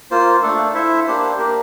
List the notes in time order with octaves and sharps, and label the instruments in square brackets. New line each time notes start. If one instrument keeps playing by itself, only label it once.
[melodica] A#3 F4 C5
A3 D4 A4
E4 A4 C5 E5
A#3 D4 G4 C5
A#3 D4 G4 A#4